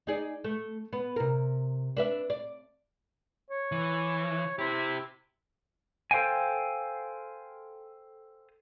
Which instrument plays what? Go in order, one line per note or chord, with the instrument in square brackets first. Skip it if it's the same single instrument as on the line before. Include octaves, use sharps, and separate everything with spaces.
[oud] D#4 G#4 D5
A3
B3
C3 A#4
D4 B4 E5
D5
[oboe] C#5
[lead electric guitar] E3
[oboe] E4 [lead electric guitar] G4 C5
[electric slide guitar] A4 C5 F5 G5 G#5